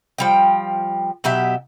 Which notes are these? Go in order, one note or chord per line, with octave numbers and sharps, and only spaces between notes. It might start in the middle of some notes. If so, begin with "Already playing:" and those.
F3 G3 G5
B2 F#3 G4 E5